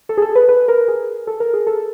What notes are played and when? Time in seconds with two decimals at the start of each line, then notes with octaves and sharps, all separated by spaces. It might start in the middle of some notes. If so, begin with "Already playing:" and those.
0.09 A4
0.18 G#4
0.22 A4
0.35 B4
0.49 B4
0.68 A#4
0.88 G#4
1.27 A4
1.40 A#4
1.53 G#4
1.67 A4